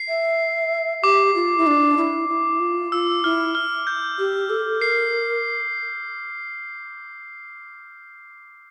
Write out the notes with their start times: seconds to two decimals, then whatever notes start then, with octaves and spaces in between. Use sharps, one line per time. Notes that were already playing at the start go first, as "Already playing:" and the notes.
Already playing: C7
0.08 E5
1.02 G4 D6
1.35 F4
1.58 E4
1.67 D4
1.97 E4
2.29 E4
2.60 F4
2.92 F4 E6
3.23 E4 F6
3.55 F6
3.87 G6
4.19 G4
4.50 A4
4.80 A#4 C7